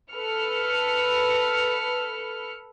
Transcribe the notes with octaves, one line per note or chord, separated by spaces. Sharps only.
A4 B4 F6 C#7